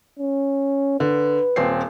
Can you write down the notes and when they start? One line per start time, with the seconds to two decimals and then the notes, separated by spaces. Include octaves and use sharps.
0.19 C#4
1.00 D3 B4
1.56 D#1 C4 C7